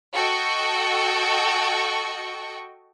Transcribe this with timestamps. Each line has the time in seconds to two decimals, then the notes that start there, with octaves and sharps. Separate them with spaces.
0.16 F#4 A4 D#5 G5 C#6